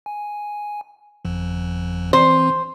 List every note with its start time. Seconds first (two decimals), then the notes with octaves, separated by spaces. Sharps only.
0.06 G#5
1.25 G1 F2 F3
2.13 E3 C4 C5